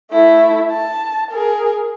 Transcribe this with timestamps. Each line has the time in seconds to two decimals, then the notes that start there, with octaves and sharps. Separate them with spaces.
0.11 A3 E4
0.71 A5
1.31 G#4 A#4